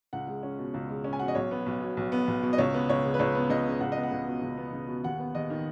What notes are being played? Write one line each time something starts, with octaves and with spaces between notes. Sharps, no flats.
C#2 F#5
G#3
C#4
B2
C#2
G#3
C#4
G#5
B2 F#5
D#5
B1 C#5
B3
B1
B2
B1
B3
B1
B2
D#5
C#2 C#5
B3
C#2 C#5
C#3
B4
C#2 C#5
B3
C#2 D#5
C#3
C#2 F#5
B3 D#5
F#5
C#2
B2
C#2
B3
C#2
B2
D#2 F#5
B3
D#2 D#5
D#3